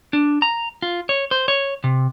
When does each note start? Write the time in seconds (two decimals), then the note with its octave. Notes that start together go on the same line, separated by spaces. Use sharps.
0.13 D4
0.42 A#5
0.82 F4
1.09 C#5
1.31 C5
1.48 C#5
1.84 C3